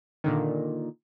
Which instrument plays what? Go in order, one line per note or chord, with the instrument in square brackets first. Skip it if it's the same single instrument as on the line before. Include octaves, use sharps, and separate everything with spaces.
[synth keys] A#2 D3 D#3